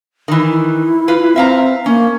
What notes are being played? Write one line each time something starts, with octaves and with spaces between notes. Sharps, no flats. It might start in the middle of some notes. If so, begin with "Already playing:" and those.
D#3 E3
E4
F4 B4
C4 E5 F5 A#5
A#3 C#4